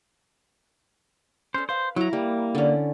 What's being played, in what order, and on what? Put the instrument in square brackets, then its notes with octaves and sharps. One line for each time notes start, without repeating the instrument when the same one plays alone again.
[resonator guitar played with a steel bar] C#4 A4 [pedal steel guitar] C5
[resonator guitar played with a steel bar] B4 F5 [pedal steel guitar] C5
[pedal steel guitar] F#3 [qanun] E4 A#5
[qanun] G3 [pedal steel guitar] A#3
[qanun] D3 C#4 [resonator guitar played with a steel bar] D5